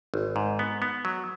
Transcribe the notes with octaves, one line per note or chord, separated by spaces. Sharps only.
G#1
G#2
B3
B3
F#3